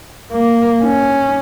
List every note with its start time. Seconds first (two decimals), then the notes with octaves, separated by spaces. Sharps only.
0.33 A#3
0.84 C#4